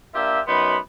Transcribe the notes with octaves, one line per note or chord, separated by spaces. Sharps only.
A#3 D4 F4 G4 E5
F#2 F#3 B3 D#4 B5 C6